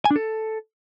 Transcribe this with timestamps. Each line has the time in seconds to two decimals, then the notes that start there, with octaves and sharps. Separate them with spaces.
0.05 G#5
0.11 D4
0.16 A4